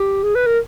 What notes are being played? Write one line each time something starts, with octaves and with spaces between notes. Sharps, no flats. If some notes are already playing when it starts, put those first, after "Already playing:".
Already playing: G4
G#4
B4
A#4